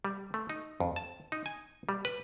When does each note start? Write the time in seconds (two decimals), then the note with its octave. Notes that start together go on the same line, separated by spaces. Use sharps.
0.04 G3
0.34 A3
0.49 D#4
0.80 F2
0.96 A5
1.32 D#4
1.46 G#5
1.89 G3
2.05 B4